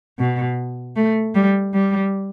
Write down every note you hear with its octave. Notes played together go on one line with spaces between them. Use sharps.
B2
A3
G3
G3